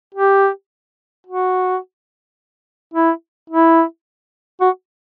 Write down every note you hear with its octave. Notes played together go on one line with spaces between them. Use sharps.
G4
F#4
E4
E4
F#4